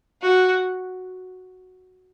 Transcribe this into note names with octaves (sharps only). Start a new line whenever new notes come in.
F#4